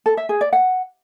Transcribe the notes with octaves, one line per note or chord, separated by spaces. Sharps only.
A4
E5
G#4
D5
F#5